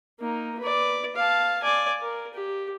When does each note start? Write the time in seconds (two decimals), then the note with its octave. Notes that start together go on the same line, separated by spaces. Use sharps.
0.20 A#3 D#4
0.59 B4 D5
1.16 F5 A5
1.63 D5 G#5
2.02 A#4
2.34 G4